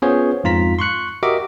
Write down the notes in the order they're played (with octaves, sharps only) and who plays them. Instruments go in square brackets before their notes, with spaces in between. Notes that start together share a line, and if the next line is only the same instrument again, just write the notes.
[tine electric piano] B3 C#4 F4 G#4 C5 C#5
F2 G#2 F4 A#5 B6
C6 C#6 F#6 C#7
F#4 G4 A#4 D#5 E5 D6